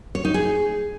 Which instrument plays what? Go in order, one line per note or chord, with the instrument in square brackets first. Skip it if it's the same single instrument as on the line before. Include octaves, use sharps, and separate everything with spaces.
[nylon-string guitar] C#5
D#4
G#4